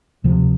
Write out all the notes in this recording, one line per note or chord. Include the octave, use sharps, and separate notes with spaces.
D2 C3 F3